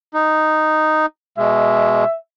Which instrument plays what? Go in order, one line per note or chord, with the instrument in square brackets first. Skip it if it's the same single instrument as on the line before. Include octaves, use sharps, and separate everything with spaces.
[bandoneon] D#4
[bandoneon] B2 G#3 [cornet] E5